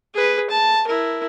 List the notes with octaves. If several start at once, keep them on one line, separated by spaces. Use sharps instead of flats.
G#4 B4
A5
E4 A#4